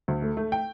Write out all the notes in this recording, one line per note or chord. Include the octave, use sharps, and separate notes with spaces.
D2
A3
A3
G5